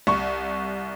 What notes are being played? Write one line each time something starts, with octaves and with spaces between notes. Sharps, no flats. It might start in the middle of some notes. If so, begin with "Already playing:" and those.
C2 C#6